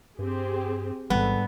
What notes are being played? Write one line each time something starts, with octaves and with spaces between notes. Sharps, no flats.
G2 C4 G4 G#4
A1 G#2 D3 G3 B3 A4